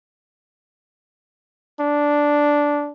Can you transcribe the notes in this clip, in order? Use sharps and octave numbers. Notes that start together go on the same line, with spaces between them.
D4